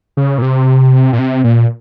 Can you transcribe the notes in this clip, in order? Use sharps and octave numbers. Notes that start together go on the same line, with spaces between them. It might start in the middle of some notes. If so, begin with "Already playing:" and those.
C#3
A#2
C3
A#2
C3
A#2